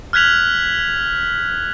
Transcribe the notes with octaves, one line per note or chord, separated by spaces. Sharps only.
F6 F#6 G#6 B6 F7 F#7